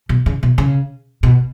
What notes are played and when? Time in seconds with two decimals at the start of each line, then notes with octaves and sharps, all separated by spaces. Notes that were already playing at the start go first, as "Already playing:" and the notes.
0.09 B2
0.26 C#3
0.43 B2
0.58 C#3
1.23 B2